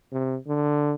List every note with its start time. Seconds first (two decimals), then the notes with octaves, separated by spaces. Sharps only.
0.12 C3
0.47 D3